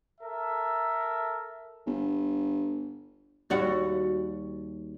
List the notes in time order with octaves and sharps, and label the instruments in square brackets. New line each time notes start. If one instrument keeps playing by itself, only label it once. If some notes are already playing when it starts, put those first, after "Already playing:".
[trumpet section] A4 A#4 E5
[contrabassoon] G1
[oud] D#2 G3 F#4